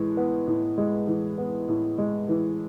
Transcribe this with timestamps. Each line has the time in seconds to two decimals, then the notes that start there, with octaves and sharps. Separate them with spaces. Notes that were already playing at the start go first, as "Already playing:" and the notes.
Already playing: A2 E3 G#3
0.17 B3
0.47 A2
0.78 G#3
1.07 E3
1.38 B3
1.68 A2
1.98 G#3
2.29 E3